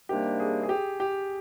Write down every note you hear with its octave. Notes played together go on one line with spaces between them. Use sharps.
C3 D#3 G3 A#3 D4 G4
G#4
G#4
G4
G4